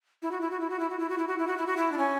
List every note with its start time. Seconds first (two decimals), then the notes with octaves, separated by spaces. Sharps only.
0.22 E4
0.31 F#4
0.41 E4
0.51 F#4
0.60 E4
0.70 F#4
0.79 E4
0.90 F#4
0.99 E4
1.10 F#4
1.18 E4
1.28 F#4
1.38 E4
1.47 F#4
1.58 E4
1.67 F#4
1.77 E4
1.92 D4
1.98 C#4